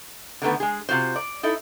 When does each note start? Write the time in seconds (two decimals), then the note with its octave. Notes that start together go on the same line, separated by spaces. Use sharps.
0.42 D3 D#3 A3 B3
0.60 G#3 G#4
0.89 C3 F4 F#4 C5
1.16 D5
1.43 D#4 E4 A4